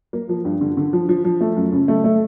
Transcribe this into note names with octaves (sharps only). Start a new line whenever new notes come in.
A#3
F3
G2
D3
D3
F3
F3
F3
A3
F#2
C#3
A3
A3